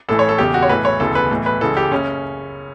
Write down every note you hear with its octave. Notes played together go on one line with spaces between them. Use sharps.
A1 A2 E3 A4
C#5
A4
E1 E2 C#3 G4
F#4
C#5
B1 A2 E3 B4
C#5
E1 D2 C#3 E3 A4
B4
B1 A2 E3
B4
C#2 C#3 E3 A4
G4
F#1 C#3 C#4